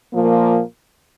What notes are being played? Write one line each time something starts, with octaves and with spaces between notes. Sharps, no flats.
A#2 F3 A#3